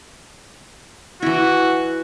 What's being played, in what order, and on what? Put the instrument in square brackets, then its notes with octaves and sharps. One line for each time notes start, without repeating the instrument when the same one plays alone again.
[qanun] E3 E4 [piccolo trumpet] F#4